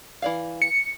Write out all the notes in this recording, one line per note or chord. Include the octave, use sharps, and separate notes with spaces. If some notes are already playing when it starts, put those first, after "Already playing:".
E3 D5 F5
C#7